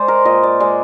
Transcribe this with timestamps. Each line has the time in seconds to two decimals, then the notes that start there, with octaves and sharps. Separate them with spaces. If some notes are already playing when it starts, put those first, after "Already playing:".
Already playing: G#3 C5 D5
0.08 A#4
0.25 A#2 D#5
0.43 D5
0.60 G#3 D5